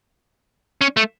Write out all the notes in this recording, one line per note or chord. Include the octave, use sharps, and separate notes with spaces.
C#4
A3